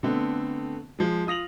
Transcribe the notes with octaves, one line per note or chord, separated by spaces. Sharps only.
D3 A3 B3 C4
F3 G#3
F4 D#6 A#6 F7 F#7